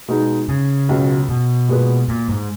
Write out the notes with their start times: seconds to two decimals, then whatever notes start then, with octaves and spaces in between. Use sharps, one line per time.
0.08 B2 G#3 D#4
0.49 C#3
0.89 C#2 B2 F#3
1.29 B2
1.69 A#2 G#3 B3 F#4 B4
2.09 A#2
2.29 G#2